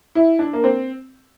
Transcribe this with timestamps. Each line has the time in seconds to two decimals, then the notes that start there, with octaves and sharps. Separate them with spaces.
0.15 E4
0.39 D4
0.53 A#3
0.64 C4